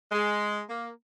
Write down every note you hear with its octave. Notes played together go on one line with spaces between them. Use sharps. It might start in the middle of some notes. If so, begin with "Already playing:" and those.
G#3
A#3